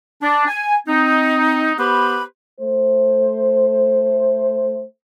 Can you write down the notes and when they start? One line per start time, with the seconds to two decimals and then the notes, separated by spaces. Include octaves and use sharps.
0.21 D4
0.47 G#5
0.86 C4 D#4
1.77 B3 G4 B4 C5 B5
2.60 A3 C5